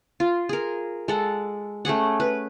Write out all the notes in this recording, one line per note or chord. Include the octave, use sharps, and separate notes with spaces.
F4
G#4 A#4
G#3 A4 F#5
A3 C#4 G#4 F#5
B4